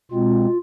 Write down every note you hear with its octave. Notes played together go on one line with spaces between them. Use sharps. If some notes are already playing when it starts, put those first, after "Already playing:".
B2 G#3 C4 F4